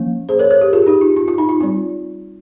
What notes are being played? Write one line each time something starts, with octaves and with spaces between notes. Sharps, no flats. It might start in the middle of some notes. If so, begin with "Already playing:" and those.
Already playing: F3 A#3 C#4
G#4 C5
A#4 C#5
A#4 C#5
G4 A#4
F4 G#4
D#4 G4
F4
F4
F4
D#4
F4
G3 C4 F4